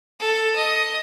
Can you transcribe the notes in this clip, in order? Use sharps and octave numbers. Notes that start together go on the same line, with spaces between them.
A4
D#5